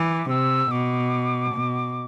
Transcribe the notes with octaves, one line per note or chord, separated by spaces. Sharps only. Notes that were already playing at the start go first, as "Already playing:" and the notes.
Already playing: E3 D6
C3 E6
B2 D6
B2